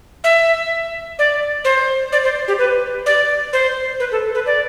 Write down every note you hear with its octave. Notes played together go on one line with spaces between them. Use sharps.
E5
D5
C5
D5
C5
G4
B4
D5
C5
B4
A4
B4
D5